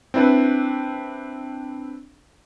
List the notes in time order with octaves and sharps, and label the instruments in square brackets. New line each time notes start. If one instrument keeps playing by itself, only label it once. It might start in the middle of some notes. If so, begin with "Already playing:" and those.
[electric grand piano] C4 D4 E4 B4